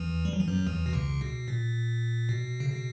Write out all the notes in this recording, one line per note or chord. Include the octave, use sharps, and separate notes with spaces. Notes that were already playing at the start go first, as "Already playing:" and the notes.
Already playing: E2 E3
G3
F#3
E3
F#2 F#3
E2 E3
B2
C#2 C#3
B2
A#2
B2
C#3
B2